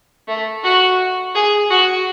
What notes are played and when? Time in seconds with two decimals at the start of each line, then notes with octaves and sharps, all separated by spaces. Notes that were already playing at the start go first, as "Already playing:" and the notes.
0.28 A3
0.64 F#4
1.35 G#4
1.70 F#4